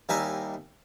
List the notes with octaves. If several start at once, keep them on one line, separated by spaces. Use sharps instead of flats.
D#2 G3 D#4 E4 D#5 G#5